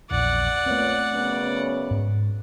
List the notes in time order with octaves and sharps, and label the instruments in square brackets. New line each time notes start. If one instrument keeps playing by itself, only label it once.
[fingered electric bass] A#1 E2 E3 [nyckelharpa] D5 F#5
[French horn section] A#2 B3 C#5 [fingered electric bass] A3 C4
[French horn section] F#2 C#3 B3
[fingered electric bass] G#2